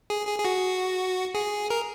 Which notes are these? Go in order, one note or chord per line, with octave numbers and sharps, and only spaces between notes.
G#4
G#4
G#4
F#4
G#4
A#4